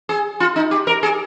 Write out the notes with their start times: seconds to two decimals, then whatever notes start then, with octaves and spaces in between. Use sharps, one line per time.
0.09 G#4
0.40 F4
0.56 D#4
0.71 G4
0.87 A#4
1.03 G#4